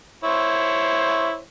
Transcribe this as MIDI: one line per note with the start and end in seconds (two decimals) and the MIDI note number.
0.24 1.40 64
0.24 1.40 72
0.24 1.40 73